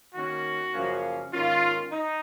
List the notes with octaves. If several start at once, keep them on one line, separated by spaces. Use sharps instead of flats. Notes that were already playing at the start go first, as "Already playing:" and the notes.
D#3 A#3 C#4 F#4
F#2 C#3 F3 A#3 C#4
G#2 D#3 A#3 C#4 F4
D#4